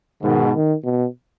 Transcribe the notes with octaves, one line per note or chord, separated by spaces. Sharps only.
G#2 B2 D#3
D#3
B2